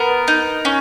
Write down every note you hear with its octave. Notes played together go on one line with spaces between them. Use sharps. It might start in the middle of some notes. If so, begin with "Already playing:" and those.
Already playing: B3 A#4
D#4
C#4